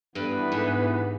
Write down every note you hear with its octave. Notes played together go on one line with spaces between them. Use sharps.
G2 E3 B3 B4
G#2